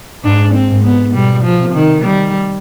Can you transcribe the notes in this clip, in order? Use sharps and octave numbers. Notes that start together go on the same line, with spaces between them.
G#2 D4
C4
G#2
B3
B2 G3
F3
C3
D#3
D#3 G3